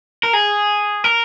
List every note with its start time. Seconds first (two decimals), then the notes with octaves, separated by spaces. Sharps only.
0.23 A#4
0.33 G#4
1.04 A#4